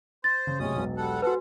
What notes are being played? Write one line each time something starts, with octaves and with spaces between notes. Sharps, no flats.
C5 A6
C#3
B1 A2 C3 G#3 C#4 D#6
E1 B1
G3 A4 F#5
F#4 A4 B4 C5 F#5 G#5